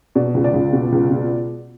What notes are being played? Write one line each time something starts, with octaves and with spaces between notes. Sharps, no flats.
B2 D5
C#2
D5
C#2
B2
C#2
B2